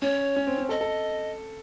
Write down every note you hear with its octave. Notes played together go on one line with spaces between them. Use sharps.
C#4 C#5
C#4
C4
C#4
A4 D#5
A4